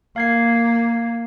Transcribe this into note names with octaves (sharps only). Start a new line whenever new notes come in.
A#3 F5 G#6 C7